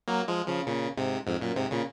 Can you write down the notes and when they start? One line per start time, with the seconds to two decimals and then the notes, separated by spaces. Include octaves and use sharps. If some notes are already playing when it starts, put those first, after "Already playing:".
0.08 F#3 A#3
0.28 F3 G#3
0.47 C#3 F3
0.67 A#2 C#3
0.97 G#2 C3
1.27 F2 G#2
1.42 F#2 A#2
1.56 G#2 C3
1.71 A#2 C#3